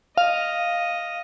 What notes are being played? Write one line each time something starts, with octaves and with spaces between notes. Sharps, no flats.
D#5 F5